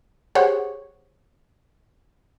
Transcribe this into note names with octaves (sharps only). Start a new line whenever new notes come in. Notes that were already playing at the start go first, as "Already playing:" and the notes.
G4 G#4 C5 C#5 F#5